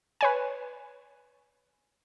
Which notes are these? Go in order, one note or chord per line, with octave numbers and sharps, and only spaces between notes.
B4 C#5 G#5